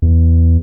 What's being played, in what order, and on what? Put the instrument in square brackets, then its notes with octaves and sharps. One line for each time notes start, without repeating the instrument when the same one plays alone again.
[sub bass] E2